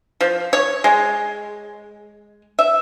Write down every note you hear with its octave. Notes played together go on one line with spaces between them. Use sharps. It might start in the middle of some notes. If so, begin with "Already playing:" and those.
F3
C#5
G#3
E5